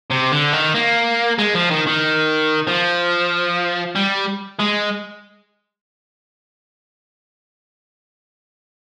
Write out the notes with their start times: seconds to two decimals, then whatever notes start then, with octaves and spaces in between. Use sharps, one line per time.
0.11 C3
0.32 D3
0.53 D#3
0.75 A#3
1.38 G#3
1.54 F3
1.70 D#3
1.87 D#3
2.67 F3
3.96 G3
4.60 G#3